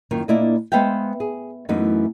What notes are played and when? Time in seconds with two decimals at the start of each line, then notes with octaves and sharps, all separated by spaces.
0.11 F#2 D#3 A#3 F4
0.28 A#2 A#3 D4 E4 D5 D#5
0.72 G#3 B3 C5 E5 F5 G5
1.20 G#4
1.69 F#2 E3 A3 B3 D#4